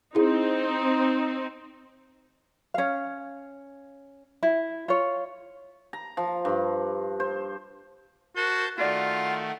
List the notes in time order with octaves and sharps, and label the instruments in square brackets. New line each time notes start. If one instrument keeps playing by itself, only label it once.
[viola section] C4 D#4 [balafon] E4 G#4
[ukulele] C#4 F5
E4
F4 C#5
[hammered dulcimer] A#5
F3
G2
C5
[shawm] F#4 [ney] A#4 [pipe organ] C5 A5 G6
[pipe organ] D#3 A3 [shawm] F4 [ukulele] F#4 D5 [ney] F#5